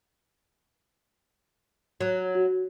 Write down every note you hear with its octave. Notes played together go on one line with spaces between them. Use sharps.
F#3
F#4